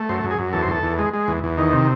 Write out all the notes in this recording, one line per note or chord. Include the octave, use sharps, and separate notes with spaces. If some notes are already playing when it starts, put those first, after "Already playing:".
Already playing: A3
F#2 C5
F#2
G#4
F#2
E2 A4
C5
E2 A4
E2
G#3
G#3
E2
E2
D#3
C3